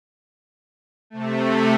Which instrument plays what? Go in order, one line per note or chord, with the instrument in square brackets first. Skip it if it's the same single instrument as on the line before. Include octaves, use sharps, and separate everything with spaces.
[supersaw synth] C3 A3